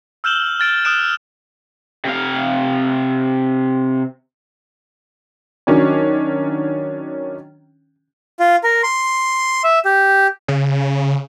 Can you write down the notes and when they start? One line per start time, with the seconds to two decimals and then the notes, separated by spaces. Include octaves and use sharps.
0.24 E6 F6 G6 E7 F#7 G7
0.60 F6 A6 D7
0.85 D#6 F6 F#6 A6 D7 E7
1.02 F6
2.05 C3 F5
5.67 D#3 F#3 C#4 D4 C#5
8.40 F4
8.64 A#4
8.83 C6
9.64 E5
9.85 G4
10.48 C#3